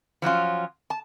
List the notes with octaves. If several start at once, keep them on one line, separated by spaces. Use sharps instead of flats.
F3 F#3 C#4 F4
A5